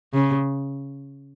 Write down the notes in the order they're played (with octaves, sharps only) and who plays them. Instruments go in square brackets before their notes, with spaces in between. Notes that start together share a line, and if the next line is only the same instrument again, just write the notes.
[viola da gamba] C#3